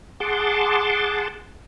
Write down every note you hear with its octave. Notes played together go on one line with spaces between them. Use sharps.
G#4 F#5 A5 C6 D6